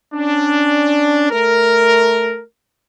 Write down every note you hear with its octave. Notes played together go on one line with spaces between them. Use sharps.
C#4 D4
A3 A#4